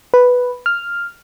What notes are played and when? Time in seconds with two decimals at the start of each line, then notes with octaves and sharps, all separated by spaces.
0.14 B4
0.66 F6